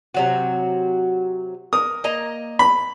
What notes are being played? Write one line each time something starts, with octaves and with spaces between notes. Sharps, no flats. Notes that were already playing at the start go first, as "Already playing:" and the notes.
C3 F#3 F#4
A#4 D#6
A#3 D#5 A#5
B5